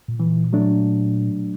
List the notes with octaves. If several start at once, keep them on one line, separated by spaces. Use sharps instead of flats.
A#2
E3
F#3 A3 D4